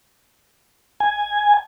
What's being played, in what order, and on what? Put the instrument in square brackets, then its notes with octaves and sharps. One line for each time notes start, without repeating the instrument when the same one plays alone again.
[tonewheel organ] G#5